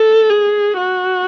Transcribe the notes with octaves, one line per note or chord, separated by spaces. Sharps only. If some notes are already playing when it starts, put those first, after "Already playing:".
Already playing: A4
G#4
F#4